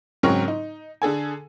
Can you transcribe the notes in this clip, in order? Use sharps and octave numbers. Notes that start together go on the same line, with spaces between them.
G#2 C#3 F#3 C4 A#4 C#6
D#4
D3 G#4 A4 G#5